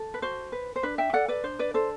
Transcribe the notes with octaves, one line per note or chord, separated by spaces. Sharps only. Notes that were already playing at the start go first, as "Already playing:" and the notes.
Already playing: A4
B4
F#4 C5
B4
C5
D4 B4
E5 G5
A4 D5 F#5
B4 D5
D4 C5
B4 D5
A4 C5